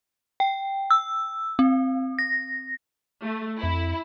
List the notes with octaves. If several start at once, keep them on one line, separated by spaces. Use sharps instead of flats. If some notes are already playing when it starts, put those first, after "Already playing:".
G5
E6
C4
A#6
A3
F2 E4